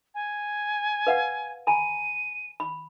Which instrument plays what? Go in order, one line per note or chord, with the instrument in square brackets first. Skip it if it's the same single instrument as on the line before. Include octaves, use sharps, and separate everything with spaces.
[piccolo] G#5
[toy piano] B4 F5 F#5
[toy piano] G#5 A#5 B5 [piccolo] D#7
[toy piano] B5